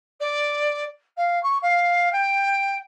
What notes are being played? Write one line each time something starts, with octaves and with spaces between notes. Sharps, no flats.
D5
F5
C#6
F5
G5